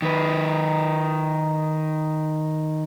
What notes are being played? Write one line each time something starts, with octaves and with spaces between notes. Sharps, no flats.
D#3 B4